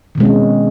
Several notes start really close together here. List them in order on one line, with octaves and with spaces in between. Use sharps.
D#3 B2 G#3 C#4 C4